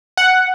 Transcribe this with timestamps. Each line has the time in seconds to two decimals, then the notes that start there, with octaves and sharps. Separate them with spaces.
0.17 F#5